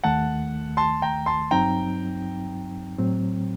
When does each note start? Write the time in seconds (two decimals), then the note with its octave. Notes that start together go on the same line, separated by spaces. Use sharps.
0.04 D#2 D#3 A3 F#5 A5
0.77 A5 C6
1.02 G5 A#5
1.26 A5 C6
1.51 G2 F#3 C4 D#4 G5 A#5
2.98 A2 F#3 C4